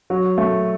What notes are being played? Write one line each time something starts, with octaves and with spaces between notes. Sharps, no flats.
F#3
A3